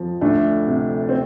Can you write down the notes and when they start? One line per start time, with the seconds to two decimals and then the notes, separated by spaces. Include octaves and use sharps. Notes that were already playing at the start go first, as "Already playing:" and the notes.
Already playing: F2 F3
0.21 D2 A3 D4
0.67 C3
1.09 C4